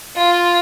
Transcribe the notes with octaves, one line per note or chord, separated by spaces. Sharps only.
F4